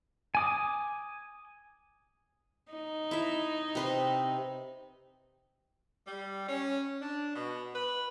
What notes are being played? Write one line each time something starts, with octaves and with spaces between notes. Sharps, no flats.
G#5 D6 D#6
D#4
E4 E5
C3 B4 C6
G3
C#4
D4
B2
B4